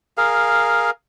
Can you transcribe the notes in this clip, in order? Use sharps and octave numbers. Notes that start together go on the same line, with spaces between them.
G#4 A#4 F5